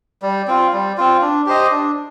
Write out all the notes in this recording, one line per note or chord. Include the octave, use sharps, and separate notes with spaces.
G3
C4 F4
G3
C4 F4
D4
G4 C5 D#5
D4